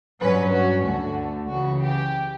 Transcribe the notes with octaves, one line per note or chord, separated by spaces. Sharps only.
G2 F#3 C#4 B4
F#4
D2 D3 A3 F#4
C#2 C#3 E3 F#4
G4